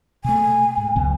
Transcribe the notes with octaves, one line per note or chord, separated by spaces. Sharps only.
B2 A3 G#5
G#2
C#2 F#2 B2